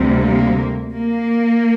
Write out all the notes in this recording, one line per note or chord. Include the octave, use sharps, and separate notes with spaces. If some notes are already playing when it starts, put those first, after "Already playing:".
Already playing: D2 C3 G3
A#3
A#3